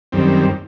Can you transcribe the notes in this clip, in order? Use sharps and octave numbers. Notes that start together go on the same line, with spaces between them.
F#2 D#3 G3 C4